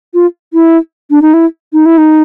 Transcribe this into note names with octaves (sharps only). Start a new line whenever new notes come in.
F4
E4
D4
D#4
E4
D#4
E4
D#4